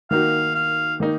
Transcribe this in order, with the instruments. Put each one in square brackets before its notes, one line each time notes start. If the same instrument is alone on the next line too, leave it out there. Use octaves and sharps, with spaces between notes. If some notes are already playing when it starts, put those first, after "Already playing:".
[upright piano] D#3 A#3 D#4 F#4 [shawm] F5
[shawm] F5
[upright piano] D#3 A#3 D#4